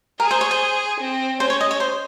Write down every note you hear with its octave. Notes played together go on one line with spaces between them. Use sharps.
G#4 A#4
C5
C#5
C5
C4
C#4 C5
C#5
D#5
C#5
C5